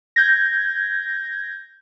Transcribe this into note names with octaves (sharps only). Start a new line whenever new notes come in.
G6 G#6 A#6